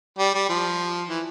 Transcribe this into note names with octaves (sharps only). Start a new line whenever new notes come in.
G3
G3
F3
E3